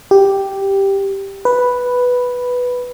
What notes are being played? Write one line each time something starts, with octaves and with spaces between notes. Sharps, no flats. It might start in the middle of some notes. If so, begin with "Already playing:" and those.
G4
B4